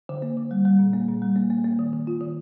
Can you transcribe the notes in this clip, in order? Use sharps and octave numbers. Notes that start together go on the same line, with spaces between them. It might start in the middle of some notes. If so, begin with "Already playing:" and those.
D3
A#3
D3
G3
G3
A#2
A#3
A#2
G3
A#3
A#3
A#3
D#3
D#3
F4
D#3